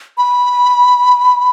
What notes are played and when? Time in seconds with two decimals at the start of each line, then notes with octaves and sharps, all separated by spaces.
0.18 B5